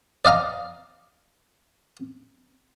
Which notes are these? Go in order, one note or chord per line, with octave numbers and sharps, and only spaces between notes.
D5 D#5 F5 A#5